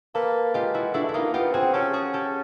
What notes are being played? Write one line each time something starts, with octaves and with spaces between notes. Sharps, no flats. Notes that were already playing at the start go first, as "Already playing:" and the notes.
A#3 A4 B4
G#3 F4 G4
E4 F#4
A3 D4 E4
A3
E4
A#3 D#4 F4
B3 F4 G4
C4 F#4 G#4
C#4 G4 A4
F#4 G#4
G4 A4